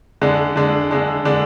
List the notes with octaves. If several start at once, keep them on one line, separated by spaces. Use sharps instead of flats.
D3 G#3 D4
D3 G#3 D4
D3 G#3 D4
D3 G#3 D4